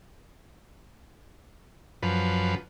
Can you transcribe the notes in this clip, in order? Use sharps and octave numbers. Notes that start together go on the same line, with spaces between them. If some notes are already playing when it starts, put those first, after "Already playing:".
F#2 F3 B4